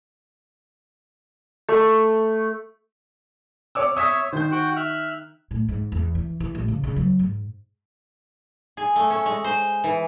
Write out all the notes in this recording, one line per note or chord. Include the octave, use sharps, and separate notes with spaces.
A3
C#5 D6 E6
C#5 E5 D#6 E6 B6
D#3 C5 G6
F#4 F#5 G5
E5 F6 F#6
A2
G#2
E2
E3
E3
A1
C#3
C#3
F#3
G#2
G#4
A3
C#4
G#3
C5
E3